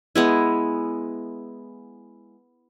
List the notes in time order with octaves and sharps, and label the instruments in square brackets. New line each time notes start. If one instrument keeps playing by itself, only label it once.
[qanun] G#3 B3 E4